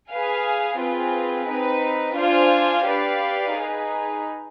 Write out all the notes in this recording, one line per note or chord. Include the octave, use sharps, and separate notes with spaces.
G#4 B4 F5 G#5
C4 F4 G#4 B4
C4 D#4 B4
D4 F4 C5 F5 G#5
G4 B4 D5 F5
D#4 G#4 B4